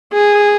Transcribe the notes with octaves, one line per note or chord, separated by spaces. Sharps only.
G#4